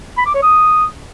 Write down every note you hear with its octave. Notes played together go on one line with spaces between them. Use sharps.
B5
D6
C#5
D#6